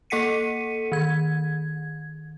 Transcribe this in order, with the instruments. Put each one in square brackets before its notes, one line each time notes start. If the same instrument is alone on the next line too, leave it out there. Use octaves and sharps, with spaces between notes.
[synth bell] A#3 A4 F#5 B6 C#7 D#7
D#3 G#6